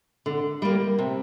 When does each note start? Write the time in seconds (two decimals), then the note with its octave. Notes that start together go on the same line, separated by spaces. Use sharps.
0.26 D3
0.62 G3 A#3
0.99 C3